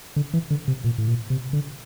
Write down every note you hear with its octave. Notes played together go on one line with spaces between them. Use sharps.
D3
E3
D3
C3
A#2
A2
A#2
C3
D3